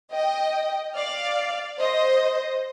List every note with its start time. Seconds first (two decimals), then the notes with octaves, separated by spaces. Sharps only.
0.12 D#5 G5
0.96 D5 F5
1.80 C5 D#5